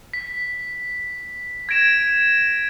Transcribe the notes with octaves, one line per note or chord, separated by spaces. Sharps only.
B6
G#6 A#6 D7 E7